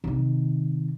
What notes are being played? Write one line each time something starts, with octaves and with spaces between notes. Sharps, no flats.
C3 D#3